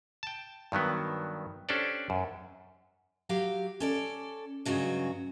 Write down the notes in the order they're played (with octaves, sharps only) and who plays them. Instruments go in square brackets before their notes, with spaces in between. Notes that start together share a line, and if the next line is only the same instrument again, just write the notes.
[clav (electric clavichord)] G5 A5
G2 D#3 F#3 B3
C#4 D4 G4 A4 C5 D5
F#2
[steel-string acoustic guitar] F#3 G4 F5
C#4 A4 D5
G2 C#3 F#3 G#3 F#4